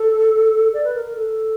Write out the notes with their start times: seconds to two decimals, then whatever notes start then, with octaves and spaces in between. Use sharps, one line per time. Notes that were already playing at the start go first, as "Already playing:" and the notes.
Already playing: A4
0.73 D5
0.84 B4
0.94 A#4
1.04 A#4
1.15 A4